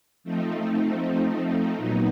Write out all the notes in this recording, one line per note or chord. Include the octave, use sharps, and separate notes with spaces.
F3 A3 C4 D#4
A#2 F#3 B3 D#4